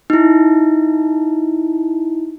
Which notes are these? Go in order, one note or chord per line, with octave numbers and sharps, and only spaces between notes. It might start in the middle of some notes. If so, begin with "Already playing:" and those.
D#4 E4